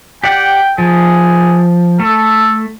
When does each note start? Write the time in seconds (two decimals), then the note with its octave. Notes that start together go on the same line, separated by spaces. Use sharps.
0.24 G4 D5 F#5 G5
0.78 F3 G#4
2.00 A3 A4